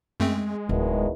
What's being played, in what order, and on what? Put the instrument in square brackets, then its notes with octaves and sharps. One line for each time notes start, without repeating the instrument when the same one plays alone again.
[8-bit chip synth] F#2 A3 C4 [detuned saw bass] G#3
[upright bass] D1 [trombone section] E2 B2 D#3